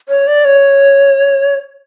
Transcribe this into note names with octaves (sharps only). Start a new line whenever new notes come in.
C#5
D5
C#5